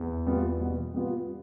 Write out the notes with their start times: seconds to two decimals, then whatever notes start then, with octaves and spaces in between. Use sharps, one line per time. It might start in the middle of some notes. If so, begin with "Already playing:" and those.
Already playing: E2
0.27 G3 B3 F4
0.60 B2
0.94 G3 B3 F4